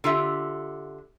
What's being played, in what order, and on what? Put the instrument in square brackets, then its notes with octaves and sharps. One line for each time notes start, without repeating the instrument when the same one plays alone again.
[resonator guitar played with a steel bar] D3 F4 G4 E5